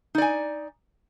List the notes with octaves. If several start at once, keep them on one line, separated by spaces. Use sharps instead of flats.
D#4 D5 G#5